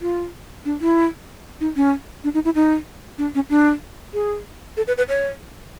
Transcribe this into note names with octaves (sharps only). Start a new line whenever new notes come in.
F4
D4
E4
D#4
C#4
D4
D#4
E4
D#4
D4
C#4
D4
G#4
A4
B4
B4
C#5